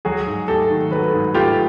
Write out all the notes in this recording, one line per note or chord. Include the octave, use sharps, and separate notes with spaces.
F#3 F#4 G#4
G#2
A3 G4 A4
D#3
F#3 A4 B4
G#2
A3 F4 G4